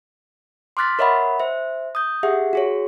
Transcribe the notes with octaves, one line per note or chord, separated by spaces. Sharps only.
C6 D6 F6 F#6 A6 B6
A#4 C#5 D#5 E5 F#5 B5
C5 E5
D#6 G6
G4 G#4 E5 F#5
F#4 G#4 C#5